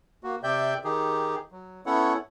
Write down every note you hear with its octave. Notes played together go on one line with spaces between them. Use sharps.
A#3 F#4
C3 D5 E5 G5 G6
D#3 D#4 G4 G#4
F#3
B3 C#4 E4 A4 C#5 F#5